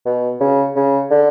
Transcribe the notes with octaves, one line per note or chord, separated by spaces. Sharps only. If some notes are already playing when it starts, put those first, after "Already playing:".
B2
C#3
C#3
D3